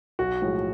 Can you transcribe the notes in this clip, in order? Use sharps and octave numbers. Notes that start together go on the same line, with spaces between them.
B1 F#4
A2 F3 G#3